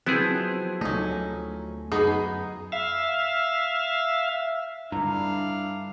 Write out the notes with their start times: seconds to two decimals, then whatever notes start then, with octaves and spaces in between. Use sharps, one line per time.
0.06 F3 F#3 B3 C4 E4 G#4 C5
0.81 D2 F#3 A3 C#4 D#4
1.92 F#2 B3 D#4 F#4 G#4
2.72 E5 F5
4.92 G2 D3 D4 E4 F5 A#5